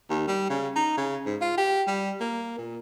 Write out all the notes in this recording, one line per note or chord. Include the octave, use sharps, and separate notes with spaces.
D#2
G3
C#3
D#4
C#3
G#2
F4
G4
G3
A#3
A#2